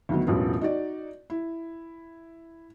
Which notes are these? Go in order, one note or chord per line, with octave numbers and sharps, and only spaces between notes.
D2 D#3 F#3 B3
E1 A1 F#3 F4 B4
D#4 F#4 D5
E4